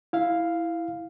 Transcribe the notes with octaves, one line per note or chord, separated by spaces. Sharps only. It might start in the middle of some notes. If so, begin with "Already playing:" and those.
E4 F5